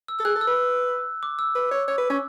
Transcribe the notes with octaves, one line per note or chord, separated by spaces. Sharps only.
E6
A4 E6
G#4 F#6
A4
E6
B4
D6
E6
B4
C#5
C#5
B4
C#4